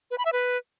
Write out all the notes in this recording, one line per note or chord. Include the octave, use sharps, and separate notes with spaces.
B4
B5
E5
B4